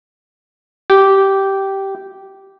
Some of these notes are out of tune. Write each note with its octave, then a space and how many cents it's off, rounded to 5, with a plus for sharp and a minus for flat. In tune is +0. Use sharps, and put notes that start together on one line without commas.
G4 -10